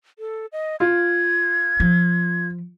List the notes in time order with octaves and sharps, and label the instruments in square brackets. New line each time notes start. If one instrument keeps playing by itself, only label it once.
[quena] A4
D#5
[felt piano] F4 [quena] G#6
[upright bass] F3